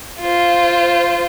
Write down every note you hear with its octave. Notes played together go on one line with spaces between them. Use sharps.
F4 C5